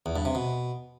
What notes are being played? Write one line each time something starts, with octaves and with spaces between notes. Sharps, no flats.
E2
G2
C3
B2